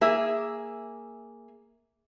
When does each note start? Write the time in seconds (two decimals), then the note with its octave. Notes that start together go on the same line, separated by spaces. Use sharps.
0.01 A#3 G#4 E5